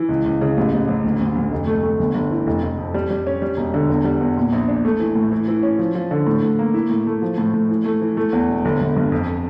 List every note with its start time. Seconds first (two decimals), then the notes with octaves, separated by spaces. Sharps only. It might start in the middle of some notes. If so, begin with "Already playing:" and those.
Already playing: E3
0.09 C#2
0.26 C#2
0.41 C#3
0.57 A1
0.73 A1
0.88 A1
1.04 D2
1.21 D2
1.35 D2
1.52 F1
1.67 A3
1.83 A3
1.99 G1
2.15 G1
2.31 E3
2.47 F1
2.63 F1
2.78 F2
2.94 G3
3.11 G3
3.27 C#4
3.42 G3
3.57 E1
3.74 D3
3.89 E2
4.05 G3
4.21 E2
4.37 A#2
4.53 A#1
4.68 D4
4.85 A3
5.00 E3
5.15 A2
5.32 E3
5.48 E3
5.63 C#4
5.79 F3
5.95 F3
6.11 D3
6.27 A2
6.43 A2
6.59 A#3
6.74 E4
6.90 A2
7.07 A3
7.22 F3
7.38 A2
7.54 A2
7.69 E3
7.85 A3
8.01 E3
8.17 A3
8.33 E2
8.48 E1
8.65 G1
8.81 G1
8.96 G2
9.12 F2